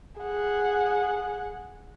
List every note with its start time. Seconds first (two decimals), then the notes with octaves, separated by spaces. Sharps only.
0.21 G#4 F#5